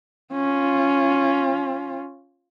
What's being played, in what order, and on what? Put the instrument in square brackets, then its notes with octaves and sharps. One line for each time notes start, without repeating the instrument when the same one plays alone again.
[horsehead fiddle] C#4 F4